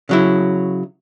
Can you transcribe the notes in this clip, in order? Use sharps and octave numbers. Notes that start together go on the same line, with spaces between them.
C#3 F#3 E4